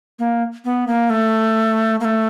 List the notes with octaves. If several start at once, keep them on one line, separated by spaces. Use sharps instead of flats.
A#3
B3
A#3
A3
A#3
A3